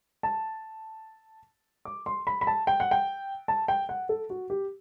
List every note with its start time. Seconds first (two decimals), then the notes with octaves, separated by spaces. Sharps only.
0.23 A5
1.85 D6
2.06 C6
2.27 B5
2.41 B5
2.47 A5
2.67 G5
2.80 F#5
2.91 G5
3.48 A5
3.68 G5
3.89 F#5
4.09 A4
4.30 F#4
4.50 G4